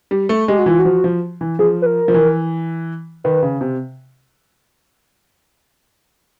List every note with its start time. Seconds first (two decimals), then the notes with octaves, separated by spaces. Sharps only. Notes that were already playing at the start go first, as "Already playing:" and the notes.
0.11 G3
0.29 A3
0.48 G#3 G4
0.59 F#4
0.66 E3 F4
0.79 F#4
0.85 F3
1.04 F3
1.41 E3
1.59 F3 G#4
1.82 B4
1.86 A#4
2.08 F3
2.14 E3
3.24 D#3 B4
3.42 C#3
3.61 C3